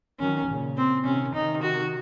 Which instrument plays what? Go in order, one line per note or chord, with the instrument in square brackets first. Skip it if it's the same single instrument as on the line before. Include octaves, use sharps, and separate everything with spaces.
[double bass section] D#3 F#3 [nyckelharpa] C#4
[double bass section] A#2 C#3
[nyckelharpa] C4
[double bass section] C3 D#3 [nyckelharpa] C#4
[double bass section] C3 D#3 [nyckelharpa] D#4
[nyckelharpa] F#4